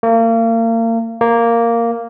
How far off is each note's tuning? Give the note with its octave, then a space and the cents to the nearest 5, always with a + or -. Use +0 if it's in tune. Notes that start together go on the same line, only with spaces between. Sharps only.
A#3 -35
A#3 -5